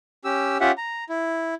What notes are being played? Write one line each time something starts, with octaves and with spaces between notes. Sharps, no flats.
C#4 G4 E6
C#4 F4 G4 E5 F#5
A#5
E4